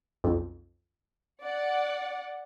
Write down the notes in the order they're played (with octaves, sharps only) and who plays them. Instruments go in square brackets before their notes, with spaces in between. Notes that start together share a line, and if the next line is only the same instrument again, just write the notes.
[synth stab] B1 F2
[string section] D5 F#5